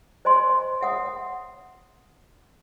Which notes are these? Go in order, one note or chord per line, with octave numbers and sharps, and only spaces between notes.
C5 D#5 G#5 C6
E5 F#5 D#6